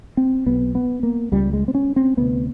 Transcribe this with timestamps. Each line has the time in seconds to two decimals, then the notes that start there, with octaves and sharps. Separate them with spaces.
0.17 C4
0.46 B1 B2 B3
0.75 B3
1.03 A#3
1.32 C#2 C#3 G3
1.53 G#3
1.68 C4
1.75 C#4
1.96 C4
2.17 D2 C3 B3